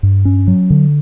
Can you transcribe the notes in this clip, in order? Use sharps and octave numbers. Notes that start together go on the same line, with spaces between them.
G2
C#4
F#3
D3